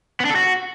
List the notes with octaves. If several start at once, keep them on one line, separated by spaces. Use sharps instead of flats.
B3
D4
A4
F#4